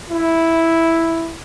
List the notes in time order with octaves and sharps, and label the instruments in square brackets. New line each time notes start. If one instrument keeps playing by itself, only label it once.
[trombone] E4